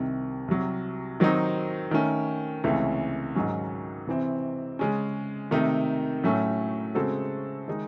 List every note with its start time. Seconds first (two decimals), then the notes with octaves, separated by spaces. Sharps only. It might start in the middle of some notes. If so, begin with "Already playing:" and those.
Already playing: C2 C3 D#3
0.48 C2 C3 F#3
1.20 D#3 F#3 C4 D#4
1.91 D#3 A3 C#4
2.64 C#2 C3 E3 A3 C#4
3.35 G#2 D#3 F#3 C#4
4.07 C3 E3 C4
4.79 C#3 G#3 C#4
5.51 C3 D#3 A3 D#4
6.23 A2 F#3 A3 C#4
6.95 C#3 G#3 C4 F#4 A4
7.68 D#3 G#3 D#4